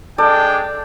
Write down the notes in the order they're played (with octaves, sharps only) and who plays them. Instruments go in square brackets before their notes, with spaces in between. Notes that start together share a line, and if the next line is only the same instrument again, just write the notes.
[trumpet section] G#3 D4 G5 [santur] A4 D5